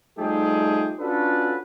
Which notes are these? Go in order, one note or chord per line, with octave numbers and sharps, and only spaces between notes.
F3 G3 A3 D#4 G4 G#4
C#4 D4 F4 F#4 A4 B4